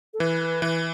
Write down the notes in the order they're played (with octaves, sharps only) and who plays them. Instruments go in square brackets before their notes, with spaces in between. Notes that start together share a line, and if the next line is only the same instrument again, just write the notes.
[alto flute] A4
[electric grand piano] E3 [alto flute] B4
[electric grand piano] E3